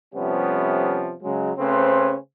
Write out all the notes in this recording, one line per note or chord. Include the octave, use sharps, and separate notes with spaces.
C3 F3 G3 A3 B3 C#4
C#3 F#3 G#3
C#3 A3 C4 C#4 B4 C5